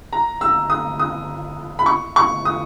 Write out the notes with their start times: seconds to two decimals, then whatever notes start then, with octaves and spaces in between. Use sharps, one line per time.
0.13 A#5
0.41 E6
0.70 D#6
0.99 D#6
1.79 B5
1.86 C#6
2.16 C#6
2.45 D#6